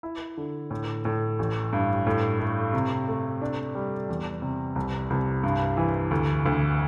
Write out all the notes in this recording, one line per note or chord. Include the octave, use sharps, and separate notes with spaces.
E4
D3
A2
A2
A1
G2
A2
A3
C3
A3
D4
G3
E2
C3
C2
C2
G2
E3
D2
D2